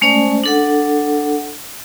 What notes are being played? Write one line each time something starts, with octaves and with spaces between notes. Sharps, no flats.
G#3 A3 C#4 C5 D5
D4 A4 F#5